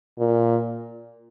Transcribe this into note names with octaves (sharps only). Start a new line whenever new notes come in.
A#2